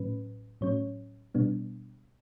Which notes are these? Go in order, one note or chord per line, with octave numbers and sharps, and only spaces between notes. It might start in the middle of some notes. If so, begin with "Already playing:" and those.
Already playing: A2 F#3 C#4 B4
A2 F#3 C#4 C#5
B2 G3 B3 D4